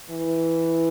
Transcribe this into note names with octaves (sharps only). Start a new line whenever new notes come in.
E3